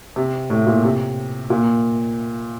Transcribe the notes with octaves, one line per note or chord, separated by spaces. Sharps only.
C3
A2
A#2
C3
A#2